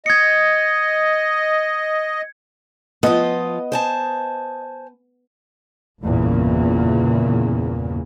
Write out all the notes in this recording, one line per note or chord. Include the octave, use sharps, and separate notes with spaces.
D#5 G#6 C#7
F3 B3 F4 D#5
C5 G#5 A5
G1 E2 A#2 C#3